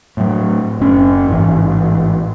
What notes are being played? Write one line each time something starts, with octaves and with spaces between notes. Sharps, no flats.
A2 F#3
F#1 C#4
A1 G#2 E3